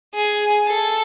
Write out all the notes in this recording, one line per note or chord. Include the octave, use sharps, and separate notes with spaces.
G#4
A4